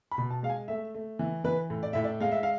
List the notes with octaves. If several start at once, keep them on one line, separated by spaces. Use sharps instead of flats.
B5
B2
A5
G#3 F5
G#5
A3 E5
A3
E3
E3 B4
A2
D5
A2 E5
D5
G#3 F5
E5
F5